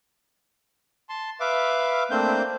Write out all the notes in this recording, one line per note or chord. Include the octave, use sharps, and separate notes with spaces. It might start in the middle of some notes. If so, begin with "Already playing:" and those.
A5 C6
B4 E5 F5 D6
A3 A#3 C4 D4 C5 G6